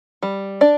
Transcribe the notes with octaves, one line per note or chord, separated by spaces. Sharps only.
G3
D4 D5